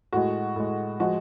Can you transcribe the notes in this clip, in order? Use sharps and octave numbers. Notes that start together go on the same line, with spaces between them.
A2 G#3 F#4
A2 G#3
F3 G#3 F#4